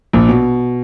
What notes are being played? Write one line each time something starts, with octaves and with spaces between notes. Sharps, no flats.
A#1 A#2
B2